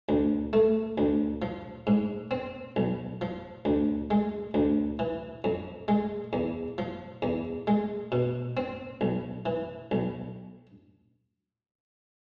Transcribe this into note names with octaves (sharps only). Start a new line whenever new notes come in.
D2
A3
D2
F3
G#2
C4
B1
F3
D2
G#3
D2
E3
F2
G#3
E2
F3
E2
G#3
B2
C4
B1
E3
B1